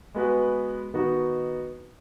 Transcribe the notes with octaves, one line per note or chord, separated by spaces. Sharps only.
G#3 B3 F#4 B4
D#3 B3 D#4 F#4